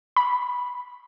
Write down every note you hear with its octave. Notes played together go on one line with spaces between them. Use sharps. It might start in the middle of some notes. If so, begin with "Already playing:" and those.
B5